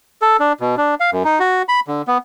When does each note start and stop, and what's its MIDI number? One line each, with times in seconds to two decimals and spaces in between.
0.22 0.37 69
0.40 0.53 62
0.60 0.75 47
0.77 0.95 62
1.00 1.10 77
1.12 1.23 42
1.25 1.39 63
1.40 1.62 66
1.69 1.80 83
1.88 2.02 50
2.08 2.18 59